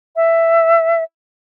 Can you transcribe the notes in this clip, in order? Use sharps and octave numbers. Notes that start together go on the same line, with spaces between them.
E5